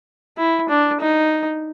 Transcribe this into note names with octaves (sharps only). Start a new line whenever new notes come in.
E4
D4
D#4